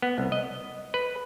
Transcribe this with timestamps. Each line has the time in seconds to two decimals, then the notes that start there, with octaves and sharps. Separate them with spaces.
0.02 B3
0.18 C2
0.32 D#5
0.94 B4